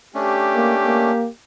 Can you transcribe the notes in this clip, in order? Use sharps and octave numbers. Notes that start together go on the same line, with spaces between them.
A3 C#4 D4 G4
A#3
A#3